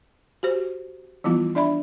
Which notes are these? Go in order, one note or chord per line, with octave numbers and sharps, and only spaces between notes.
F#4 G4 C5
E3 F3 G3 B3 E4 F4
D4 D5 E5 B5